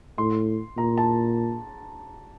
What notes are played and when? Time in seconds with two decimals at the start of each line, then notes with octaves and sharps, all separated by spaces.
0.18 A2 C6
0.77 A#2 A#5
0.98 A5